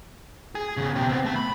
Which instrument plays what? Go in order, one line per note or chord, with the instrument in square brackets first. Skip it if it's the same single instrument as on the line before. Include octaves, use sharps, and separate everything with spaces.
[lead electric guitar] G#4
E2 C#3
B2 G4
B3 C4
A3 A5
B5